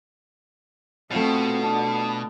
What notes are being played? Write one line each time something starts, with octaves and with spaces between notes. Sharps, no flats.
B2 A3 C4 F4 D#5
D4 A5